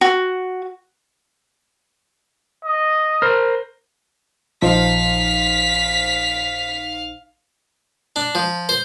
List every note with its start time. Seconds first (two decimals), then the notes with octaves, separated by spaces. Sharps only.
0.01 F#4
2.65 D#5
3.22 A#4 C5 F6
4.62 A#1 F3 D#4 C5 F5 B6
8.16 D4
8.35 F3
8.69 C5